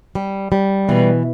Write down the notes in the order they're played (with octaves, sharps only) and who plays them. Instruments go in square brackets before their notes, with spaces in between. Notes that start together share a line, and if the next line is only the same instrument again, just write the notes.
[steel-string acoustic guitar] G3
G3
[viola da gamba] B2 [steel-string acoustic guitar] E3